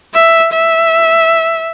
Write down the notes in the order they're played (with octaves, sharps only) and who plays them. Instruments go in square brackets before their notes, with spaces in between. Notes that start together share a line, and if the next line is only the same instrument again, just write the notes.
[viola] E5
E5